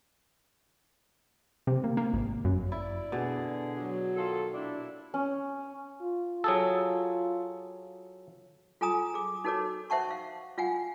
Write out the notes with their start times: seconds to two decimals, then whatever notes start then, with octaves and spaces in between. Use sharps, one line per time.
1.67 C3
1.84 A#3
1.97 A#3
2.13 G#1
2.45 F#2
2.72 E4 D5
3.12 B2 D3 G#4
3.79 F#3
4.16 D#3 F4 A4
4.54 A#2 D4 E4
5.14 C#4
6.02 F4
6.44 F#3 G#4 A4
8.81 F4 A4 G#5 A#5 D#6
9.14 G#4 D6
9.44 D#4 F#4 A4 A#4 C#5 D6
9.90 C5 E5 F#5 A5 C#6
10.11 F5
10.58 F4 F5 F#5 G#5